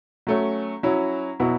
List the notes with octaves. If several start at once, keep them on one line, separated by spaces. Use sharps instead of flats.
F#3 A3 C#4
F#3 C#4 E4
B2 F#3 B3 E4